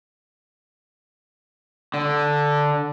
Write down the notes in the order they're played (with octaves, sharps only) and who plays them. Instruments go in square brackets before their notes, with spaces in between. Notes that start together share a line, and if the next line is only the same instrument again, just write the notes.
[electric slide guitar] D3